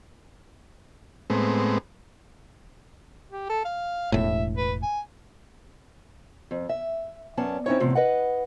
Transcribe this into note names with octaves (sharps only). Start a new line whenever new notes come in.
A2 G#3 B3 C4
G4
A4
F5
E1 A2 E5
B4
G#5
F2
E5
F#2 B3 C#4 D5 A5
C4 C#4 D#4 E4 C#5
E2 A2 C3 F3
B4 D#5 F#5